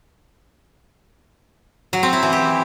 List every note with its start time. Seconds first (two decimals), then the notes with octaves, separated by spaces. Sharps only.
1.93 F#3
2.03 C4
2.13 E4
2.23 E3
2.32 G4